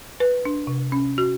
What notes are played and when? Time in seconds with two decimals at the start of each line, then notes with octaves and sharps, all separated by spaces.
0.20 B4
0.45 D4
0.67 C3
0.92 C#4
1.18 F#4